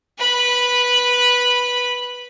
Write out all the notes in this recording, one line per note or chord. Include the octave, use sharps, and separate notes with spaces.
B4 B5